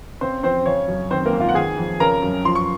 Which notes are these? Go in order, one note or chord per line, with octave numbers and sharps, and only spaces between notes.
C#3 C4 C5
F2 C4 C5
C#3 C#4 C#5
F#2
D#3 C4 C5
A#3 A#4
G#2
F4 F5
F#5
D#3 G#4 G#5
F2
C#3 A#4 A#5
F#2
F3 C6
C#6